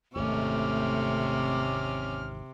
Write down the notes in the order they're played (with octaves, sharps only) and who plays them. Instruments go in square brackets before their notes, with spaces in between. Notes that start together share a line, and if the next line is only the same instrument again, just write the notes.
[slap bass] G#1 E2 [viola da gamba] C3 [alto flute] A3 [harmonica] C#4 D6 F6